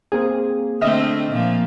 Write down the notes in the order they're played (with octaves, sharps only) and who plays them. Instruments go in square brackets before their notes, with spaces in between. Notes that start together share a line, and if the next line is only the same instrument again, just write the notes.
[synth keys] A#3 C4 G#4
[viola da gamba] D3 A3 C4 [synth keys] D#5 E5 F6
[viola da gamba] A#2 F3